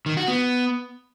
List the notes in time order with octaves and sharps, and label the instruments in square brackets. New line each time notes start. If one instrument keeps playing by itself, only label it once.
[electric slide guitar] D#3
F#4
B3